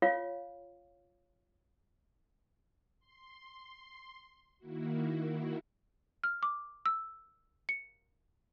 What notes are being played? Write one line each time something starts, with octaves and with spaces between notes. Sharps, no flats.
F4 C#5 F5
C6
D#3 A#3 E4 F#4
F6
D6
E6
C#7